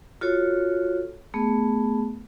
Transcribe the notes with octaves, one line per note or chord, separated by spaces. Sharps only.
F4 F#4 A4 C#5
A3 B3 G#4